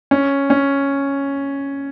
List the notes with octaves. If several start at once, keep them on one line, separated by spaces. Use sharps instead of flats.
C#4
C#4